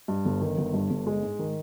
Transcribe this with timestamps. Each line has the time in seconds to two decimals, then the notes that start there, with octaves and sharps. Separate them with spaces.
0.08 G2
0.25 G1
0.41 D#3
0.58 G1
0.74 G2
0.90 G1
1.07 G#3
1.23 G#2
1.39 D#3